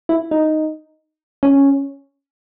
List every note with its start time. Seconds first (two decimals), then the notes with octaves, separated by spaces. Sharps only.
0.09 E4
0.31 D#4
1.43 C#4